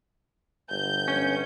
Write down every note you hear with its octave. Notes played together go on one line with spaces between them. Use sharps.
G1 G6
C#4